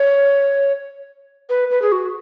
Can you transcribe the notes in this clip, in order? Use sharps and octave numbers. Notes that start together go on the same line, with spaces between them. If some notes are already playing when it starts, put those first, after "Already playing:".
Already playing: C#5
B4
B4
G#4
F#4